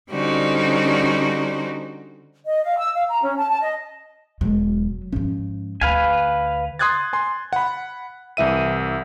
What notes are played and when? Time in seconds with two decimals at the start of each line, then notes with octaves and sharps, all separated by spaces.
0.11 D3 G3 C#4 D#4 F#4 C5
2.46 D#5
2.64 F5
2.78 E6
2.96 F5
3.08 A#5
3.22 C#4
3.37 A5
3.49 A5
3.61 D#5
4.41 E1 F#3 G#3
5.12 G#2 F3 C#4
5.81 D2 B4 F5 G#5
6.79 C6 D#6 F#6 G#6 A6
7.13 G#5 C6
7.53 F#5 B5
8.37 C2 E3 E5 D#7